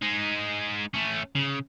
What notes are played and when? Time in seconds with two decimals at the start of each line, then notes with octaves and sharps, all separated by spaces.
0.02 G#3 D#4
0.94 A3 C#4
1.35 C#3